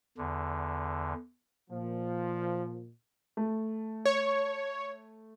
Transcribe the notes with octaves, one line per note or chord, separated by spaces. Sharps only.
E2 D3
A#2 F3
A3
C#5